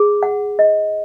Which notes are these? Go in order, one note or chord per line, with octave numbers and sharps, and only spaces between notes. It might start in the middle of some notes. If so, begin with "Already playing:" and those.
Already playing: G#4
F#5
D#5